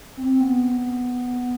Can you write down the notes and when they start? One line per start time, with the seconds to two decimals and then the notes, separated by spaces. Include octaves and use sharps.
0.17 C4
0.29 C4
0.40 B3